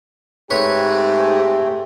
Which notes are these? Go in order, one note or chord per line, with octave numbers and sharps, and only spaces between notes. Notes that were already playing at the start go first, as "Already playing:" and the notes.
G#2 A3 C4 G4 G#4 B4 C#5